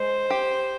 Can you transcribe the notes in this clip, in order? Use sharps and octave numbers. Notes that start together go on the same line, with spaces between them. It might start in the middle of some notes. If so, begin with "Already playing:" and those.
Already playing: G#3 C5 D#5
G4